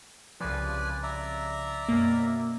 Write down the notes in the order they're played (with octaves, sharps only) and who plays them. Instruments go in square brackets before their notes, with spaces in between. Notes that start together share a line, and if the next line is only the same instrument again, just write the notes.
[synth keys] C2 C#3 F3 [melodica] B4 D5 G#5
[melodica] D5 E5 A#5
[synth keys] F#2 B2 A#3